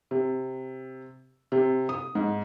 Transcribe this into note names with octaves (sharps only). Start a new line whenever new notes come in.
C3
C3
D#6
G#2